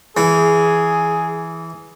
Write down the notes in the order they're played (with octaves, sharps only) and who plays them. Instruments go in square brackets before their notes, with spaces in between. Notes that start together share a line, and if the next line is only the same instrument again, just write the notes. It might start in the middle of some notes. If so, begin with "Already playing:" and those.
[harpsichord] E3 [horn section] G#4